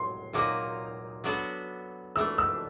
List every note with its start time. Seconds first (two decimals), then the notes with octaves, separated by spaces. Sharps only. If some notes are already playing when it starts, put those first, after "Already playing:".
Already playing: A2 F#3 C6
0.33 A#2 F#3 A#3 D#4 D6
1.24 F#3 B3 D4 F#4 A4
2.16 E3 A3 D4 E6
2.38 E6